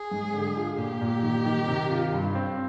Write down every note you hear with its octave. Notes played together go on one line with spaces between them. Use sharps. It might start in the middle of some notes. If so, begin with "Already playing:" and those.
Already playing: G#4
G#2
D3
F4
A#2 G4
A#2
D#3
D#3
C3
F4
G2
C4